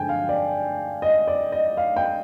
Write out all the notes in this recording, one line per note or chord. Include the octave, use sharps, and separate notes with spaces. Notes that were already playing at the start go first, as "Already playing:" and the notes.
Already playing: G2 D3 F3 G#3 C4 G5 G#5
F5
D5
D#5
D5
D#5
F5
G5